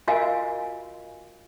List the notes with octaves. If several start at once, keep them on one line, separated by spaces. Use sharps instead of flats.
F4 F#4 A#4 D#5 F5 G#5